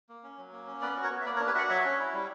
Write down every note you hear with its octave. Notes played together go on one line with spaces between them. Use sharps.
A#3
C#4
F#3
A#3
C#4
B3 B4 D5
F#4
A#4 C#5
B3
E5
A#3 B4 D5
A#4 C#5
D4
G4 B4
F#4 D5 E5 F#5
F#3 C#5 E5
C#4
E4
G3